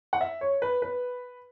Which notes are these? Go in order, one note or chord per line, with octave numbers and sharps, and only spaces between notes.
F#5
E5
C#5
B4
B4